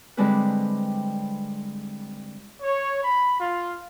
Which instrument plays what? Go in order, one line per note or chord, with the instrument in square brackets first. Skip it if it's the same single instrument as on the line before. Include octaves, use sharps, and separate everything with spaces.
[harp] D3 G3 G#3 C4 E4 B4
[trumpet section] C#5
B5
F4